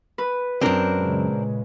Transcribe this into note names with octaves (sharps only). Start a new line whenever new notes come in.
B4
C#2 F#2 C4 D4 A#4
A#2 C#3 G#3